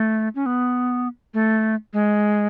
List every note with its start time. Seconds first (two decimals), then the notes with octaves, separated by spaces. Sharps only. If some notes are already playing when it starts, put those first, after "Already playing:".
Already playing: A3
0.35 C#4
0.46 B3
1.34 A3
1.93 G#3